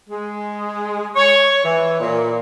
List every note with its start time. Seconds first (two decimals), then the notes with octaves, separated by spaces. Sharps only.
0.09 G#3
1.15 C#5
1.64 E3
2.00 A#2